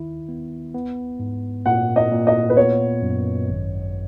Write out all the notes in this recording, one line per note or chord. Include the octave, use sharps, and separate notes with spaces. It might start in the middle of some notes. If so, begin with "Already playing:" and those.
Already playing: D#3 E4
B3
B3
G#2
A#2 F#5
D#5
A#2
D#5
B4
B3 C#5
F#2
G#1